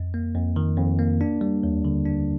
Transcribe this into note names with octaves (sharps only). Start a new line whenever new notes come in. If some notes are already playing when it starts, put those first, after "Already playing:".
Already playing: F2
A#3
F2
D#3
F2
A#3
D4
G3
D#2
D3
D4